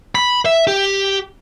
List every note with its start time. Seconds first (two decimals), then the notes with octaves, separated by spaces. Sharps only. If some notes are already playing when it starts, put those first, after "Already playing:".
0.15 B5
0.45 E5
0.67 G4